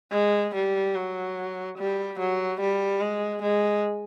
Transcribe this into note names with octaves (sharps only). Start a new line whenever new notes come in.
G#3
G3
F#3
G3
F#3
G3
G#3
G#3